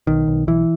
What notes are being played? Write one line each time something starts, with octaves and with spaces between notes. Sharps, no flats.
B1 D#3
B1
B1 E3